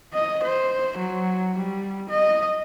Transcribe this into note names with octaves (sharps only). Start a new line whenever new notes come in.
D#5
C5
F#3
G3
D#5